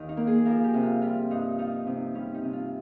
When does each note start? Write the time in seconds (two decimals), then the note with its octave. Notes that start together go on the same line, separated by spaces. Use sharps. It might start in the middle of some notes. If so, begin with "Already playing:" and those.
Already playing: D#2 D#3
0.09 D#4
0.17 A#3
0.27 G#4
0.45 F3 A#4
0.64 G4
0.74 C3
0.83 F4
1.02 G3 F4
1.30 G2 D#4
1.58 F3 D#4
1.86 C3 D#4
2.15 G3 C#4
2.34 D#4
2.43 C3
2.53 F4